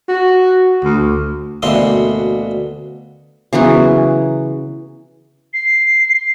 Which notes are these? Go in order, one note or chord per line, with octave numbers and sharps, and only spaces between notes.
F#4
D2
D2 B2 E3 A#3 D4 C6
C#3 E3 F#3 B3
C7